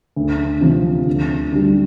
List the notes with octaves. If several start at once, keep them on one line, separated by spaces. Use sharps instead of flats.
D2
C3 F3
D2
D3 G3